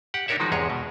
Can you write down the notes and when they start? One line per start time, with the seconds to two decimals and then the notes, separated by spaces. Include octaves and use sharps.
0.14 G4 F#5
0.28 D4 D#4 G4 A#4 C#5 E5
0.40 D#3 F3 G#3 D#4 F#4
0.52 E2 G#2 C3 G#3 G#4 C#5
0.70 B2